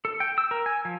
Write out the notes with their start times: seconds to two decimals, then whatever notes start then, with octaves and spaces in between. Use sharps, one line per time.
0.05 A4
0.20 G5
0.38 E6
0.51 A#4
0.66 G#5
0.85 F3